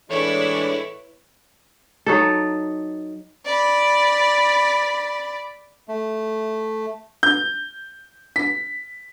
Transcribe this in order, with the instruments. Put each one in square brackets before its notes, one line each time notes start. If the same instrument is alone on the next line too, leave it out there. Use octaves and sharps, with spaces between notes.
[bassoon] A2 [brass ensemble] E3 G#3 D4 [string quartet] E4 B4 [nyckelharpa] C#5
[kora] F#3 D#4 A4
[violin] D5 B5
[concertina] A3
[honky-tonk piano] G6
B6